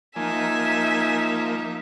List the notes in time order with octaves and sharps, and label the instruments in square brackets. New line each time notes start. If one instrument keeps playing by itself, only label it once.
[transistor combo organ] F3 A#3 [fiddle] D#4 [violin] E5 [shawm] G#5